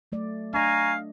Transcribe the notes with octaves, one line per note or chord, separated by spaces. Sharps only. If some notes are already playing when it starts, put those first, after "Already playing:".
F#3 A3 D5
D4 D#5 F5 G#5 A#5 C#6